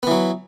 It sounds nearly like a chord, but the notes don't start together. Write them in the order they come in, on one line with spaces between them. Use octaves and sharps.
B3 E3 F#3